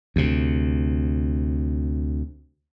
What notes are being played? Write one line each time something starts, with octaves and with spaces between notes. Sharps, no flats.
D2 C3